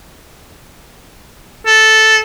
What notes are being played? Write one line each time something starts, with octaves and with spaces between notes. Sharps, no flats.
A4